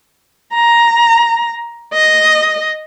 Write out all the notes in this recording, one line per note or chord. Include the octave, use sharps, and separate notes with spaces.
A#5
D#5